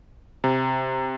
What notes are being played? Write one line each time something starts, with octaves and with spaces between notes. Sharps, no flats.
C3